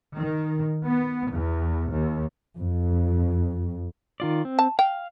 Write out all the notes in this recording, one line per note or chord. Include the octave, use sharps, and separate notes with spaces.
D#3
B3
E2
D#2
F2
D#3 F4 D5
C4
A5
F5 G5